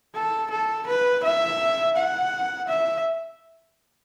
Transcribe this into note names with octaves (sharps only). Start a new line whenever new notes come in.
A4
A4
B4
E5
F#5
E5